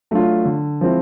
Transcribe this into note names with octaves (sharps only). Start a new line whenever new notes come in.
F#3 A3 D4 F4
D3
F3 G#3 C4 E4